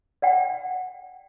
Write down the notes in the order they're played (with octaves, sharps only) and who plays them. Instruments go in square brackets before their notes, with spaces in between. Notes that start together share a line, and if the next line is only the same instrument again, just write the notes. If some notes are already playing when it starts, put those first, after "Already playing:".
[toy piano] D5 F#5 G5